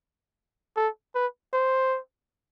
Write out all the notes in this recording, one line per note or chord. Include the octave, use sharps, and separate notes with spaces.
A4
B4
C5